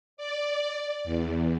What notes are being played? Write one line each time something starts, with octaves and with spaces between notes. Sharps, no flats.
D5
E2